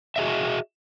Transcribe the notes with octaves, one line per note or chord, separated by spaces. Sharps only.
F#4 G#4 D#5 E5